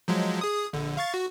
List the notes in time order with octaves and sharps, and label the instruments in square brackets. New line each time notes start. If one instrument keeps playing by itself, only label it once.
[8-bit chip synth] F3 F#3 G#3
G#4 D#6
A#1 D3
F5 C#6 A6
F#4